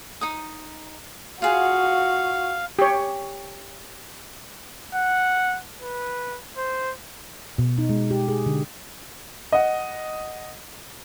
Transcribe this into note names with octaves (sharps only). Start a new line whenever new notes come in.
D#4 D#6
F4 F#4 G#4 F5 F#5
G4 C#5
F#5
B4
C5
B2
D#4
G#3
G4
G#4
D3
D#5 F#5